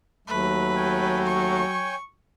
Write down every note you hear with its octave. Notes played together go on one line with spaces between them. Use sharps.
D#2 F#3 A3 B4
C#5 G5 G#5
C#6